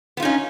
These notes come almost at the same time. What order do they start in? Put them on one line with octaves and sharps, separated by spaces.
B3 F4 D#4 C#4